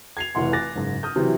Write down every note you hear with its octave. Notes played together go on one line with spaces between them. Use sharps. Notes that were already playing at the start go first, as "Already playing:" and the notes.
G#6 C7 F7
F1 E3 F#5 C6
G#5 D6 F#6 A6 A#6
F#1 G#2
D#6 F6 G6
C3 E3 F#3